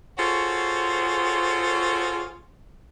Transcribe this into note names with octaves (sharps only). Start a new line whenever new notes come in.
F4 F#4 G#4 A4 C5 C#5